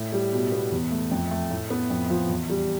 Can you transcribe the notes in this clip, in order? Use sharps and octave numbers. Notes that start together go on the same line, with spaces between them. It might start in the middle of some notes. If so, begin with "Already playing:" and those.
Already playing: A2
G3
B2
B3
E2
A3
F2
A3
A2
B3
F2
F3
E2
G3